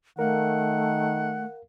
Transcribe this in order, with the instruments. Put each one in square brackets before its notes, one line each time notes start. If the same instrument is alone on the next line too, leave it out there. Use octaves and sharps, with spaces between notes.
[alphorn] D#3 [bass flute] A3 [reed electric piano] A#4 F5 [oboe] F#5